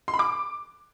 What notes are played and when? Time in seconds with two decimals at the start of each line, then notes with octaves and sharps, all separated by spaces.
0.08 C6
0.14 B5
0.19 D6